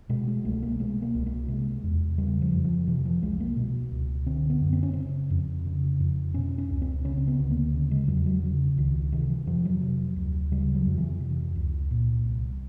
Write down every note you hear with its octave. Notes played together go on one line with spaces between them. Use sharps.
B2 G#3
G#3
C2 A3
A#3
B2 G#3
A#3
C2
A#3
C3 G#3
E2
C#3 G3
F3
F2
F3
C3 E3
F3
C2 G#3
A#3
B2
C#2
D3 C4
B3
F#2
C4
C#4
C#3 C4
F2
C#3
F2
B2 C#4
C#4
C#2
C4
C#3 C#4
C4
B3
D2
A#3
C#3
G#3
E2 F#3
F#3
C#3
C#2 D#3
C3 D#3
E3
F2 F3
F#3
C3
D2
C#3 G3
F#3
F2
E3
C3
C#2
A#2
C2